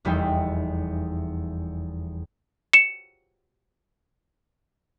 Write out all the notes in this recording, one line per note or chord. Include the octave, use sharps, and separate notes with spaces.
F1 E2 G3 B3 D#4 G5
C#7 E7